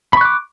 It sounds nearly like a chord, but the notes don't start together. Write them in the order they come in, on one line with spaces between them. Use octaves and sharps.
B5 C#6 F#6 D6